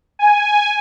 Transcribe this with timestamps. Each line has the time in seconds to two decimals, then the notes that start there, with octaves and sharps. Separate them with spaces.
0.19 G#5